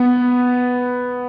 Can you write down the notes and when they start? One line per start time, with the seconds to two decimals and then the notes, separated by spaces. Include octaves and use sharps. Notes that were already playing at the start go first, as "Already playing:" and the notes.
Already playing: B3